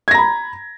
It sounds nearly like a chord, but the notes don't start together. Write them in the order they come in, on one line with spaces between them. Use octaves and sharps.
G#6 A#6 A#5 B5